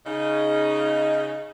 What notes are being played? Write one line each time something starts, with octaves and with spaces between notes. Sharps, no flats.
C#3 D#4